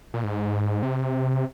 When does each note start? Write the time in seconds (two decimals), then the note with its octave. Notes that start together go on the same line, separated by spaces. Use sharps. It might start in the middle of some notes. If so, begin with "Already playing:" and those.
0.14 A#2
0.24 G#2
0.83 C3